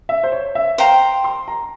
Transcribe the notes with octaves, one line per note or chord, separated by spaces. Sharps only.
E5
C5
C#5
E5
C5 F5 G5 A#5
C6
A#5